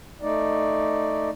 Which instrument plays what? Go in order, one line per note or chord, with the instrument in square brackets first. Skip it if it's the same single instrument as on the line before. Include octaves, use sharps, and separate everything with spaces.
[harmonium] A3 D#4 D5